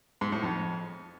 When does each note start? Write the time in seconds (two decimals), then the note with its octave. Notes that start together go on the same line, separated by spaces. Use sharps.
0.21 G#2
0.32 A2
0.43 F2